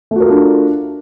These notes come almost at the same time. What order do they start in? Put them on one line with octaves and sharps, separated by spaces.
A3 F#4 A#4 F4 D4